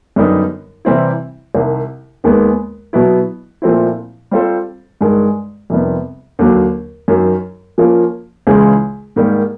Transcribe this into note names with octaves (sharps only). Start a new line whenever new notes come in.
F#2 D3 G3 B3 D#4
C3 E3 G3 C4 E4
C2 C3 D#3
D#2 D#3 G#3 B3
B2 F#3 B3 E4
A#2 F3 A3 C4 E4
G3 C4 F4 A4 C5
G2 D#3 G#3
F2 C3 D#3 G3 B3
D#2 D3 F#3
F#2 D#3 F#3
F3 A#3 C#4 F4
C#2 C#3 E3 G#3 C#4
G#2 D#3 G3 A#3